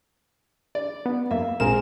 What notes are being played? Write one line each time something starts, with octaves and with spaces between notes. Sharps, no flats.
D5
B3
F#2 A#3 E5 F5
A1 A#2 G#3 C4 A#4 G#5 E7